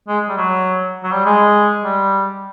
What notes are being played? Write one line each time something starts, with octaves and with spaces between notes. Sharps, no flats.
G#3
G3
F#3
F#3
G3
G#3
G3